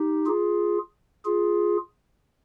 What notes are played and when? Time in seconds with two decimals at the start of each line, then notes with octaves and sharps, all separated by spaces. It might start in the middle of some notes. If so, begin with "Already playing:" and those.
Already playing: D#4 G4
0.26 F4 G#4
1.25 F4 G#4